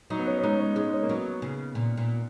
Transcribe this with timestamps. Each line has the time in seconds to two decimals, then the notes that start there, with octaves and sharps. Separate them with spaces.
0.10 F#3 D#4
0.19 B3
0.27 C#4
0.38 C#4
0.43 G#3 D#4
0.60 C#4
0.76 G#3 D#4
0.93 C#4
1.03 A#3
1.09 F#3 B3
1.42 C#3
1.75 A#2
1.97 A#2